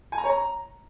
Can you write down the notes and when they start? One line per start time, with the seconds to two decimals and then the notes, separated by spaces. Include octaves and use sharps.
0.12 G#5
0.18 A#5
0.24 C#5
0.30 A#5